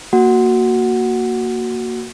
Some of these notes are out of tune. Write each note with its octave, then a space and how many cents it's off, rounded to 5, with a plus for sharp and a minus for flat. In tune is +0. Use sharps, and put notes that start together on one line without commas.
A#3 -5 F#4 +0 F#5 +0